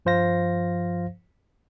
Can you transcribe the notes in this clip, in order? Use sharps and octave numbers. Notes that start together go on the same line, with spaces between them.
G2 F3 C5 F5 A#6